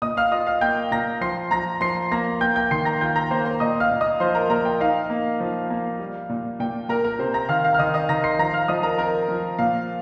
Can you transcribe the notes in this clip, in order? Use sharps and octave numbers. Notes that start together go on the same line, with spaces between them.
A#2 D#5 D#6
F5 F6
F4 D#5 D#6
F5 F6
A#3 G5 G6
A#2 A#5 A#6
F3 C6 C7
F3 A#5 A#6
F3 C6 C7
A#3 A#5 A#6
A#3 G5 G6
G5 G6
D#3 C6 C7
A#5 A#6
F4 G5 G6
A#5 A#6
A#3 C5 C6
C5 C6
A#2 D#5 D#6
F5 F6
A#2
D#5 D#6
F3 C5 C6
A#4 A#5
A#2 A#4 A#5
G5
D#4 F5
A#3
F3
A#3
G3
A#2
A#2 G5
A#2 A#4 A#5
A#4 A#5
C3 C5 C6
A#5 A#6
D#3 F5 F6
F5 F6
F6
D#3 D#5 D#6
D#5 D#6
D#3 A#5 A#6
C6 C7
F3 A#5 A#6
F5 F6
F3 D#5 D#6
A#4 A#5
C4 A#4 A#5
F3
A#2 F5